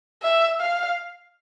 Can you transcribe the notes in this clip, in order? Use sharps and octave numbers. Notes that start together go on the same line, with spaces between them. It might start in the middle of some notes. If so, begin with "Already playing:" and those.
E5
F5